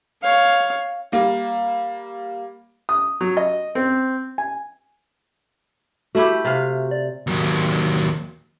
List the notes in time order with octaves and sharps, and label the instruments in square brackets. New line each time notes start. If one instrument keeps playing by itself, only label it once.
[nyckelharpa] C#5 F5
[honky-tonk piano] G3 A#3
[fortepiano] D#6
F#3
D#5
C4
G#5
[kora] A3 E4 G4 [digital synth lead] F#4
[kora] C3 F5
[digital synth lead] D5
[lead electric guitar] D#2 F#3